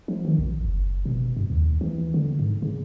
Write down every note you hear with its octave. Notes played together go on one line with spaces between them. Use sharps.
F3
D#3
A1
F#1
B2
G2
D#2
E3
D3
G#2
C#3